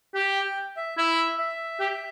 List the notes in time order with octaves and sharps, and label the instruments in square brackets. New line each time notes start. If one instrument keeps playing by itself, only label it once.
[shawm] G4 [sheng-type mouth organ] G5
[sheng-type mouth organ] E5
[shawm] E4 [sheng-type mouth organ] E5
[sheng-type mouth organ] E5
[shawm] G4